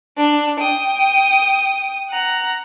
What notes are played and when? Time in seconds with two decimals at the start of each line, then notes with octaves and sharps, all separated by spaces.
0.17 D4
0.60 G5 D#6
2.11 F#5 A#5